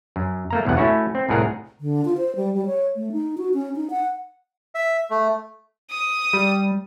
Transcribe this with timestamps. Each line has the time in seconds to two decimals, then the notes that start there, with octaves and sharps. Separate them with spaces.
0.16 F#2
0.50 A3 A#3 A#5
0.65 B1 E2 G2 F#5
0.77 A3 C#4 E4 F#4 C#5
1.15 C4
1.29 C2 A2 G#4 A#4 F#5 A#5
1.81 D3
2.05 F4
2.17 C5
2.36 G3
2.54 G3
2.66 C#5
2.96 A3
3.12 D#4
3.38 F#4
3.54 C#4
3.76 D#4
3.90 F#5
4.75 E5
5.10 A3
5.90 D#6
6.33 G3